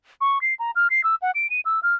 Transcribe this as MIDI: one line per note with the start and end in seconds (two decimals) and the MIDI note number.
0.21 0.41 85
0.41 0.54 96
0.59 0.71 82
0.75 0.88 89
0.90 1.04 96
1.04 1.15 88
1.22 1.31 78
1.35 1.50 98
1.50 1.60 99
1.65 1.80 88
1.83 1.95 89